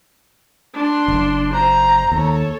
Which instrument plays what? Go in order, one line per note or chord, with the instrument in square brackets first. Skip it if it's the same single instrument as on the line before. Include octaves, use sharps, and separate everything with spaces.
[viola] D4 C6
[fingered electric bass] F#1
[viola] C5 [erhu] A#5
[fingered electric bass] D#2 [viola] A4 C#5